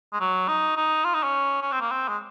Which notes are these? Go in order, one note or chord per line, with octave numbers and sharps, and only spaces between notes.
G#3
F#3
D#4
D#4
F4
D#4
C#4
C#4
C4
A#3
C4
G#3